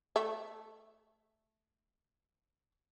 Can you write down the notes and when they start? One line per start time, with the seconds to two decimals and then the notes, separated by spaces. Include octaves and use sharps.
0.16 A3 E5